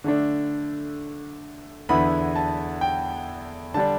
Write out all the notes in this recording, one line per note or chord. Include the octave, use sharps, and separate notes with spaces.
D3 A3 D4
E2 D3 B3 E4 B5
A5
G5
D3 G3 D4 A5